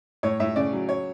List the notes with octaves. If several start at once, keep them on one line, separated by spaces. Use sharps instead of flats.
A2 C#5
A2 E5
C#3 D5
F#3
C#5